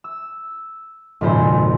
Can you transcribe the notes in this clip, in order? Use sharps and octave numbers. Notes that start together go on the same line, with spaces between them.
E6
G#1 F2 A#2 C#3 C5